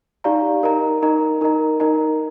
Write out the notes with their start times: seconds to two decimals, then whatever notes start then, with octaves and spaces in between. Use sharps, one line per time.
0.24 D#4 G4 D5 F5 A#5
0.63 D#4 A#4 D#5 A#5
1.02 D#4 A#4 D#5 A#5
1.41 D#4 A#4 D#5 A#5
1.80 D#4 A#4 D#5 A#5